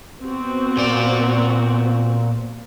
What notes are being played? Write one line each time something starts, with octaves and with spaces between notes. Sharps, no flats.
B3 C4 F#4
A#2 D5